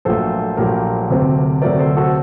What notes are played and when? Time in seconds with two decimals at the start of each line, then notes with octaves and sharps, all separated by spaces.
0.05 A#1 A#2 F#3 A3 A4 C5
0.57 A#1 A#2 F#3 A3 G4 A#4
1.10 D2 C3 F#3 A3 C4
1.62 D2 C3 F#3 A3 C4 A#4 D5
1.79 A4 C5
1.97 F#4 A4